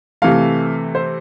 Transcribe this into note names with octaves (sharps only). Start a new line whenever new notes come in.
C3 E3 A3 F5
C5